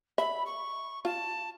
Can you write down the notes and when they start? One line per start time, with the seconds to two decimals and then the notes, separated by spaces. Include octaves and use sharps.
0.18 E5 B5
0.46 C#6
1.05 F4 A5